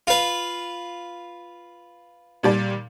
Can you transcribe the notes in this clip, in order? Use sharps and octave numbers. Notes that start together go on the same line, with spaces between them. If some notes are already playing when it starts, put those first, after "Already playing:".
F4 B4
A#2 G3 D5